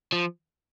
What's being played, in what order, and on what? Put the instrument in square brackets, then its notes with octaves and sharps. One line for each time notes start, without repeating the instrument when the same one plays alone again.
[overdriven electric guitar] F3